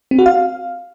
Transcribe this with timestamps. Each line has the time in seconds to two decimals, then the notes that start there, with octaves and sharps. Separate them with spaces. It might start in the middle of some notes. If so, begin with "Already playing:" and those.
0.11 C4
0.19 F#4
0.26 F5